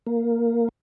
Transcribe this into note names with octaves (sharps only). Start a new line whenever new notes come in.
A#3